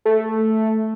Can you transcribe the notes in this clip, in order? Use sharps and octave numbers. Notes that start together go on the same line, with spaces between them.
A3